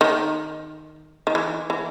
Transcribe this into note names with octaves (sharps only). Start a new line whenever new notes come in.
D#3
D#3
E3
E3